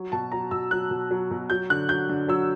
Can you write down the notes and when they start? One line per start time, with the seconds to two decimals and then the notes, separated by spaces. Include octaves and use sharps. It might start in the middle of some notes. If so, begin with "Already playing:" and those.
Already playing: F#3
0.12 B2 A5
0.32 F#3 A#5
0.51 B2 E6
0.71 F#3 F#6
0.91 B2
1.11 F#3
1.31 B2
1.50 F#3 G6
1.70 D3 F#6
1.89 F#3 G6
2.09 D3
2.28 F#3 E6